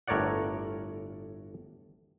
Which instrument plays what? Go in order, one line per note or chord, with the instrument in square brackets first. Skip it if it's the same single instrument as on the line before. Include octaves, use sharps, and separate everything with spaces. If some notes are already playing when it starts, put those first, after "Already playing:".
[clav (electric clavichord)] G1 A2 A#4 C#5 D5 F#5